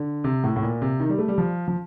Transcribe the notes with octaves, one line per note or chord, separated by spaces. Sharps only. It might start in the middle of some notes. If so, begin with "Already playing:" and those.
Already playing: D3
C3
A2
A2
A#2
C3
D#3
G3
A3
G3
F3
F3